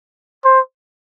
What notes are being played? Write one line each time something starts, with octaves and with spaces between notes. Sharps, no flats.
C5